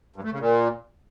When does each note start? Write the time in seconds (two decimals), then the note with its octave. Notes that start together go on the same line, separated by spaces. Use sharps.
0.16 G2
0.24 A3
0.32 C#3
0.40 A#2